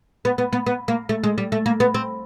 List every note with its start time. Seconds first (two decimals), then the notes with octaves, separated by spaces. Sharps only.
0.25 B3
0.38 B3
0.53 B3
0.66 B3
0.88 A#3
1.09 A3
1.24 G#3
1.38 G3
1.52 A3
1.66 A#3
1.80 B3
1.94 C4